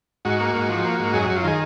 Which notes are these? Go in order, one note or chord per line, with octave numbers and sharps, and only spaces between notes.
G#2 F#4
A#3
G#2
F3
A#3
G#2
F#2 G#4
F#2 F#4
F4
D#3 G#4